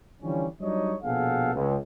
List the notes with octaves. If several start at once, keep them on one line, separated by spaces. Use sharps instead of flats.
D3 E3 F3 G3 C#4
F#3 G3 D4 D#4 C#5 D#5
A#1 B2 G#4 A4 F5 F#5
C#2